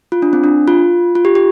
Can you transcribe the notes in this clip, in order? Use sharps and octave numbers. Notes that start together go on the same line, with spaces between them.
F4
D4
C4
D4
F4
F4
G4
G4